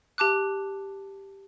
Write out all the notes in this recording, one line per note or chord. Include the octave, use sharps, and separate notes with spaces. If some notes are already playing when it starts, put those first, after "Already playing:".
G4 A5 D6 F#6